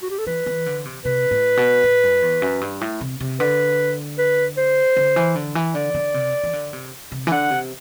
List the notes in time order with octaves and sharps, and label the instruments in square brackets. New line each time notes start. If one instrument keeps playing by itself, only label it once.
[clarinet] F#4
G4
A4
[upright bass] E3 [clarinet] B4
[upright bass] E3
D3
C3
[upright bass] C3 [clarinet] B4
[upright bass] A2
B2
A2
F#2
E2
F#2
G2
A2
C3
C3
[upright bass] D3 [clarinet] B4
[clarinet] B4
C5
[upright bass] D3
E3
D3
E3
[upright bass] D3 [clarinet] D5
[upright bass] D3
C3
E3
D3
C3
C3
E3
[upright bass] D3 [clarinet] F#5
[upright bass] C3